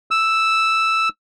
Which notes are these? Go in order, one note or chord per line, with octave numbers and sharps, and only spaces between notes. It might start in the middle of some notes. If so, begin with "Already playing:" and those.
E6